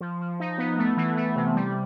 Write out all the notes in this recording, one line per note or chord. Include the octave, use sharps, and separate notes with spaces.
F3
F3
D#4
B3
A3
E3
A3
C3
G3